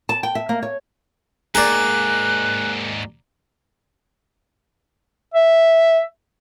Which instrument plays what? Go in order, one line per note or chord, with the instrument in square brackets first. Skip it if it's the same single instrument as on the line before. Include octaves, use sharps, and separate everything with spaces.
[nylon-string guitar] A5
G5
E5
A#3
C#5
[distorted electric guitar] D#2 G#2 [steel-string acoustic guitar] A#3 G#4 [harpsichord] D5 A#5 [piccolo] F#6
[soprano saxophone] E5